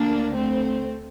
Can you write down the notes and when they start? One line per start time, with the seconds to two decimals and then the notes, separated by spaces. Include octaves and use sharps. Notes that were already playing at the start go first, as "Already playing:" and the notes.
Already playing: D2 D3 A#3 D4
0.36 A3 C4